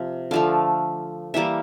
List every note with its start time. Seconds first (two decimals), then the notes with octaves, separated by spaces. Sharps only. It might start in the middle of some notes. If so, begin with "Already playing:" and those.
Already playing: C3 F3 F5
0.31 D3 F3 A3 F5
1.34 E3 G3 A#3 E5